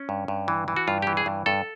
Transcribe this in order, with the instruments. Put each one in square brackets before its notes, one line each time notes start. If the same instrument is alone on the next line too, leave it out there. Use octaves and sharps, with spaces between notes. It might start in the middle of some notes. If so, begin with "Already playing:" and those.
Already playing: [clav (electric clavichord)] C#4
G2
G2
E3
E3
F#4
G2 F4
E3 G4
G#4
G2
G2 A4